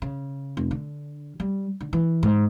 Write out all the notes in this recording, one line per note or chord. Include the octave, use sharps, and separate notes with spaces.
C#3
F1
D3
G3
D3
E3
G#2